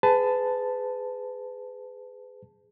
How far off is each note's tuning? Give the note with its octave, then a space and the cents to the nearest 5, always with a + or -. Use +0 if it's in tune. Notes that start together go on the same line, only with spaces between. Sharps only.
G#4 +0 B4 +30 A5 +0